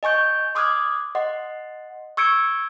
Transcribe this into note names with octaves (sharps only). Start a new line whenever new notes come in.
D#5 G#5 C#6 G6
C6 D6 D#6 F6 F#6 G#6
D#5 F#5 C6
C#6 E6 G#6 C#7 D7